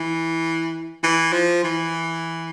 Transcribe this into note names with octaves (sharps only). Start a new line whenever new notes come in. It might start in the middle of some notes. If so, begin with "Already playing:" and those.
Already playing: E3
E3
F3
E3